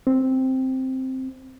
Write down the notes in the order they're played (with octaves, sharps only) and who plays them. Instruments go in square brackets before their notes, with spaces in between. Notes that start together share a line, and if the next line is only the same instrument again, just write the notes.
[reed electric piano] C4